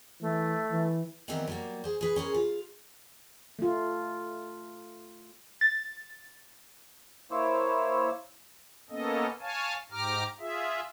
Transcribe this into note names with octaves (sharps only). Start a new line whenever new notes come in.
E3 A3
E3
D#3 E3 G3 B3 C4 A#4
F#3 G3 A#3
G#4 C5
G#4 B4
C#4 G#4 A#4 C5
F4
A3 F4
A6
A#3 E4 C5 C#5 D6 E6
A#3 B3 C#4 A4 D#5
C#5 F5 G#5 A5
G#2 G4 A#5 D6 F6
F4 G#4 E5